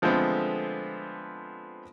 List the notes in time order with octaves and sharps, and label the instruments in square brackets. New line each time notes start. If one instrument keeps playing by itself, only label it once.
[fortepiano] D3 F3 G#3 A3 B3 C4